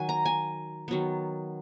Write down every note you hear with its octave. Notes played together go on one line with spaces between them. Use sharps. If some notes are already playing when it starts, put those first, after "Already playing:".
Already playing: D#3 F#3 F#5 G#5
A#5
G#5
D#3 F#3 B3